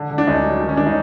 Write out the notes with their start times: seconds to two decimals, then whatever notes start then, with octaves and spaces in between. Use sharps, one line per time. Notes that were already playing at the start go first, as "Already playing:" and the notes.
Already playing: D3
0.10 D3
0.18 D4
0.27 D2 C#4 D#4
0.44 F#3
0.61 D#3
0.69 C#4
0.77 D#3 D4
0.86 D#4